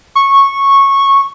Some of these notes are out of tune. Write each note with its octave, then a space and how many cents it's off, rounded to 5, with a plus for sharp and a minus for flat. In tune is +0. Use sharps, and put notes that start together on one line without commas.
C#6 -10